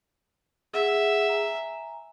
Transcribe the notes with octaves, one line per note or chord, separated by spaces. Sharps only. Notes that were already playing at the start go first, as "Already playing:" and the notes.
G#4 E5 F#5
G#5 A#5